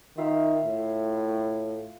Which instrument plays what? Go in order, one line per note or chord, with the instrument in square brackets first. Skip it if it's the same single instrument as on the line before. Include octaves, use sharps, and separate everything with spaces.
[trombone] D#3 [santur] F4 E5 F5
[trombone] A2